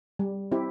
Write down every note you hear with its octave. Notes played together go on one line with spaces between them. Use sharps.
G3
C4 E4 G4